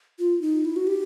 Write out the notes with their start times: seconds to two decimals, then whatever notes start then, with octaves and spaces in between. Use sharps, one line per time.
0.19 F4
0.42 D#4
0.65 E4
0.76 F#4
0.87 G4